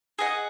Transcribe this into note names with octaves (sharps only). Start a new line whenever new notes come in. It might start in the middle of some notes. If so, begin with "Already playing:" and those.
G#4 D#5 F#5